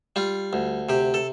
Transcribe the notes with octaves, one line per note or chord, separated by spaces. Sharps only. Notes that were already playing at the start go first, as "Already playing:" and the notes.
G3 F4
D2
C3 G4
A4